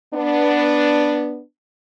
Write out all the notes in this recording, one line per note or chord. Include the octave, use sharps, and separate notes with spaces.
B3 D4